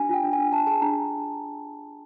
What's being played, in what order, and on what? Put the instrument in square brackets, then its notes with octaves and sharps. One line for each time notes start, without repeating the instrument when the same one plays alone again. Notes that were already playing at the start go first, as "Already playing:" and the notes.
Already playing: [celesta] D4 G4 G#5
F4 G5
D4
G#5
D4
D4 A5
G#4 A5
D4 A#5